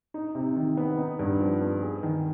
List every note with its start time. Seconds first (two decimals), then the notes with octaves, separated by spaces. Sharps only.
0.14 D#4
0.35 C3
0.56 D#3
0.77 B3
0.98 D#4
1.19 G2
1.41 F3
1.61 B3
1.82 G#4
2.03 D#3